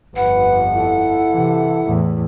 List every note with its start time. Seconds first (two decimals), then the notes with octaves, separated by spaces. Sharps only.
0.16 G1 F2 B4 F#5
0.75 E4 A4
1.31 C3 E3
1.85 E2 A2